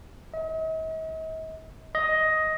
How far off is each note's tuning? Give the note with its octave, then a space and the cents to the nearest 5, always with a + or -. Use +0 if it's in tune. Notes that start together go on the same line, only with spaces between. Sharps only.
D#5 +45
D#5 +10